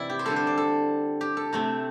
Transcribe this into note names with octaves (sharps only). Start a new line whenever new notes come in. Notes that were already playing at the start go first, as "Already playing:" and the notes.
Already playing: C3 E3 E4 D5 G5
G4
C5
D3 G3 C4 A4
C5
D5
A4
G4
A4
C3 A3 C4